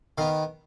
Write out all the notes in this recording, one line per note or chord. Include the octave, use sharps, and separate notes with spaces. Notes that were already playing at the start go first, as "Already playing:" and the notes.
D#3 B3 F5